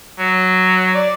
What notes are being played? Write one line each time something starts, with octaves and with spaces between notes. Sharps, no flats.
F#3
D5